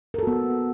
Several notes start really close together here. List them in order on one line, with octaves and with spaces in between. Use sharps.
A#4 A4 F#4 B3